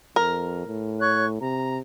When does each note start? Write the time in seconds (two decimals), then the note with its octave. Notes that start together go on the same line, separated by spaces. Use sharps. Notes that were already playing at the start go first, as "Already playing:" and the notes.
0.16 F2 A#4
0.67 A2
0.99 C#5 C#6 F#6
1.41 C3 A#5